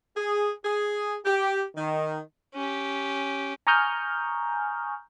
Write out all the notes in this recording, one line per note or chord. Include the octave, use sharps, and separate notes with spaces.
G#4
G#4
G4
D#3
C#4 G4
G#5 A#5 C#6 D#6 F6 G6